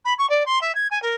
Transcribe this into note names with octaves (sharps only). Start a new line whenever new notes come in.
B5
C#6
D5
C6
E5
G#6
G#5
A#4